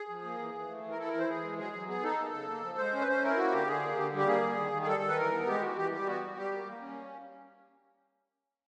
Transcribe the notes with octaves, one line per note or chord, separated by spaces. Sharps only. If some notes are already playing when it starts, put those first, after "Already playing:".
Already playing: G#4
F3
A#3
E3
E3
A3
E3
A#4
E4 A4
A#4
E3
C5
E3 G#4
G#3
F#3 G#4
F#3
B3 G#4
D#4 A4
A#3
C#3
A#3
F3
G#3 C5
C#4
B4
C#4 C5
E4 A#4
A#3 F#4
D3 G4
D3 G#4
A#3
D3 G4
G3 G4
A#3 G#4
G3
D#3
D#3
G#4
G3 A4
D#3
B4
E3 A#4
B3
G#3 G4
E3 F#4
E3 G4
G3 G4
B3 F#4
G3
G3 G4
A#3
A#3
C#4